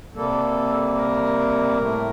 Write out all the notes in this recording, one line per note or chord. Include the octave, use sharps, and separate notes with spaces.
C3 G3 A#3 A4
A#4
A2 A3